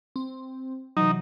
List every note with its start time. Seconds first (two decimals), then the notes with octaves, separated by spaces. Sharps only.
0.16 C4
0.97 C3 E3 F#3 D#4